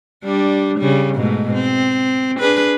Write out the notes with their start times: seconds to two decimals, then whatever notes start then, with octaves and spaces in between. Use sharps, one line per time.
0.24 G3 D4
0.79 C#3 G3
1.14 G#2 B2 A3
1.54 C4
2.40 D4 G#4 B4